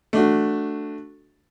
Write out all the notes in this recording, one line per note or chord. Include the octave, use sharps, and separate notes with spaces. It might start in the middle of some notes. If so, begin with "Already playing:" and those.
A3 D4 F#4